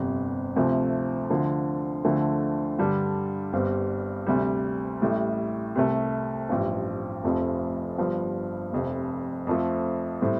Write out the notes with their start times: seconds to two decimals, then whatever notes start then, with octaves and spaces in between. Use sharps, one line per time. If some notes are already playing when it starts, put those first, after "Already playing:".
Already playing: G1 F2 C3
0.56 D2 C3 F3 A3
1.30 D2 D3 F3
2.05 D2 D3 F3 A3
2.78 G2 D3 G3 D4
3.53 G1 G2 G3 C4
4.26 D2 C3 G3
5.01 A1 A2 G3
5.75 C2 C3 A3
6.49 A1 G2 F3
7.24 F1 F2 F3 A3
7.98 G1 G2 F3
8.73 F1 F2 C3
9.47 F2 F3 A3
10.21 A2 G3 C4